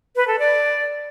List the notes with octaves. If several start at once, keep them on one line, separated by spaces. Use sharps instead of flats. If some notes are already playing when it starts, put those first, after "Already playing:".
B4
A4
D5